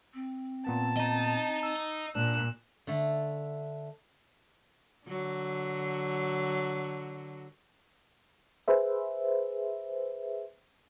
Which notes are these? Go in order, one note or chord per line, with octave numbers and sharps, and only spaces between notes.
C4
A#2 B3 A5
D#5 A#5
E6
A#2 D4 E6 F#6
D3 A3
D3 F#3
G#4 B4 C5 E5